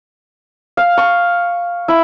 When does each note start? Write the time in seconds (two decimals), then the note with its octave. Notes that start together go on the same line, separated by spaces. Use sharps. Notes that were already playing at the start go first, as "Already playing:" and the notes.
0.77 F5
0.97 C#6
1.88 E4